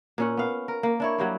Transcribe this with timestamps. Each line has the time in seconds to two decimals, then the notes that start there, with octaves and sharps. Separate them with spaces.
0.18 A#2 C#4 F#5
0.37 B3 F5
0.68 A#4
0.83 A#3
1.00 D4 E4 C#5
1.18 F#3 G3 A#3